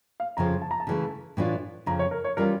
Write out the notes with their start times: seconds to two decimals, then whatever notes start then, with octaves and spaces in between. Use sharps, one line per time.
0.20 F5
0.37 F2 C#3 F3 A#5
0.62 A5
0.71 A#5
0.80 A5
0.87 C#3 E3 A3
1.37 A2 E3 A3 D4 F4
1.86 F2 C#3 F3 A#5
1.99 C#5
2.11 A#4
2.24 C#5
2.37 E3 G3 C#4 F4 A#4